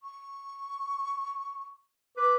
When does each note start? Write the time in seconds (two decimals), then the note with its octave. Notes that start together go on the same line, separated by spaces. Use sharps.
0.03 C#6
2.17 B4 D6